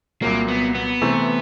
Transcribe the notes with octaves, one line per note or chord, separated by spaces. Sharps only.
C2 A#2 F#3 A#3
B3
B3
C3 E3 A3 C4